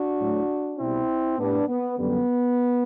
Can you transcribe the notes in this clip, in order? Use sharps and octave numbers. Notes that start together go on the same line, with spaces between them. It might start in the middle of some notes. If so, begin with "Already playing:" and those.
Already playing: D4 F#4
A2 F#3
B2 G3 C4 E4
A2 G3 B3 D4
B3
F#2 D3 G3 B3